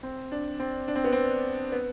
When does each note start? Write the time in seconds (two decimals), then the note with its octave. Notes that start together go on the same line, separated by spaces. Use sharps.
0.03 C4
0.32 D4
0.60 C4
0.88 D4
0.95 C4
1.04 B3
1.12 C4
1.72 B3